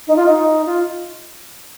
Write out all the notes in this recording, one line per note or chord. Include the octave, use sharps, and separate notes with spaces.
D#4
F4
D#4
F4